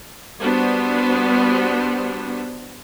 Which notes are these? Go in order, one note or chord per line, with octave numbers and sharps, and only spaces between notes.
G3 B3 D4 F#4 C5